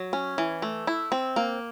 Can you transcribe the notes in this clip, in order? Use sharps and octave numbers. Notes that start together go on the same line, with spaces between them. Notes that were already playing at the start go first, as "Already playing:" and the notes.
Already playing: F#3
C#4
E3
A3
E4
C4
A#3